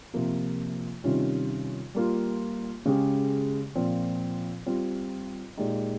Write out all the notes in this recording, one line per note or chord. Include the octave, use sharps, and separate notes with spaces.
C3 F3 A#3 F4
C3 D#3 G3 C#4 F4
G3 A#3 F4
C#3 G#3 C#4 G4
A#2 F3 C4 F4
G3 C4 F4
A#2 G#3 D#4 G4